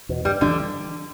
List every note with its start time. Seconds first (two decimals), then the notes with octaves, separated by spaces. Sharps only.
0.09 E2 B2
0.25 G2 G3
0.41 D3 E3 G3 D4